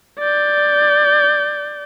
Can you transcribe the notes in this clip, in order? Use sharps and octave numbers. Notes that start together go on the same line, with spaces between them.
D5 G6